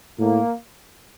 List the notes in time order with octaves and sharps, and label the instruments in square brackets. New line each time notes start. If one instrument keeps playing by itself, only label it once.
[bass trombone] A2 [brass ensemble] A#3